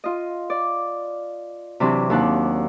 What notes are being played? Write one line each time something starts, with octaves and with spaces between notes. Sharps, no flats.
F4 D#5
D5
C3 E3 F#3 C4 D4
D#2 D4 F#5 F#6